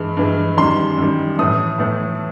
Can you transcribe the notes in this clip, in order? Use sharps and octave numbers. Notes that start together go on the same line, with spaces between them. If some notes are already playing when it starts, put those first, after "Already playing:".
Already playing: G2 E3 G#3
G2 E3 G#3
F#2 D#3 G3 C6
F#2 D#3 G3
A2 E3 A3 D#6
A2 E3 A3